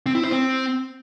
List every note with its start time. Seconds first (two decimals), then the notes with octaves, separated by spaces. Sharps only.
0.06 C4
0.15 E4
0.24 C5
0.32 C4